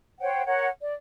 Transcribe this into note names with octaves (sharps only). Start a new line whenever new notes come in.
C5 C#5 F#5 G5
A#4 C#5 F#5
D5